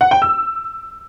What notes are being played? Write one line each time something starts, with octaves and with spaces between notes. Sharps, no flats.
F#5
G5
E6